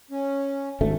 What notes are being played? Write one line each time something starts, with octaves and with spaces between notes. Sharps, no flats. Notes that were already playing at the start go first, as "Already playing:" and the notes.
C#4
G#1 D2 A3